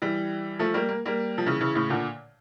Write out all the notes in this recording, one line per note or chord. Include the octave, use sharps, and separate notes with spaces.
E3 G3
F3 A3
G3 A#3
A#3
G3 A#3
F3
C#3 E3
C#3 E3
A2 C#3
A#2 D3